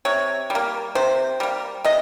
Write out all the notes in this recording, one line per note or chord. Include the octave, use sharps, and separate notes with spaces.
C3 C#5
G3
A#3
C3 C5
G3 A#3
C3 D#5